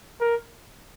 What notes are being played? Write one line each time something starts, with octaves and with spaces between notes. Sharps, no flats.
A#4